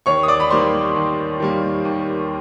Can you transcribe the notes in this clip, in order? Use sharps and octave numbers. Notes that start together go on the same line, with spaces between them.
D#2 C#5 C#6
D#6
D5 D6
B5
D#3 G3 A#3 C5 C6
D#2
D#3 G3 A#3
D#2